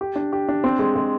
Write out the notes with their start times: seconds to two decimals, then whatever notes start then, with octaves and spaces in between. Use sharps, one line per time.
0.01 G4
0.16 D4
0.33 G4
0.49 D4
0.64 C4
0.79 G#3
0.96 G#3